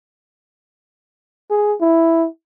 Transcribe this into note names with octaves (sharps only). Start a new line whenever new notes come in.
G#4
E4